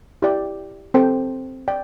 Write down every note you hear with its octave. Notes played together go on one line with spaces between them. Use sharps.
E4 G4 D5 G5
C4 A4 C5 G5
D5 G5